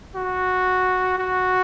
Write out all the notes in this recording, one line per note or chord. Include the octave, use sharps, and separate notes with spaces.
F#4
F#4